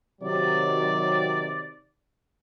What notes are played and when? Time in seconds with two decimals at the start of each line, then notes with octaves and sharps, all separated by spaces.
0.22 C3 D#3 F#3 D5